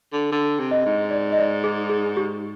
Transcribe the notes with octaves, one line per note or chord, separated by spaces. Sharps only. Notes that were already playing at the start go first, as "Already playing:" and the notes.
D3
D3
C3
D#5
G#2
D5
D#5
D5
G#4
G#4
G4